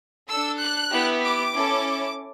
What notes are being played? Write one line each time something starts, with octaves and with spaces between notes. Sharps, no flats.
D4 A4 E6
F#6
B3 E4 G4
D6
C#4 E4 A4